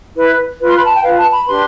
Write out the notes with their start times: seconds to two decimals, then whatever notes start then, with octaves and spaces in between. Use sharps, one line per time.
0.15 E4 B4
0.59 F4 B4
0.67 C6
0.76 B5
0.85 A5
0.94 G5
1.03 F4 B4 F5
1.18 A5
1.32 B5
1.47 D4 G4 B4 C6